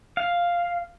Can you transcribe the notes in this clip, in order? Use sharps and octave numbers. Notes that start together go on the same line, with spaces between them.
F5